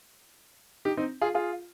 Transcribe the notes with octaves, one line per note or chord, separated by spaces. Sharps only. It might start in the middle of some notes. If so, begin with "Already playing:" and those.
D#4 G4
C4 D#4
F4 G#4
F4 G#4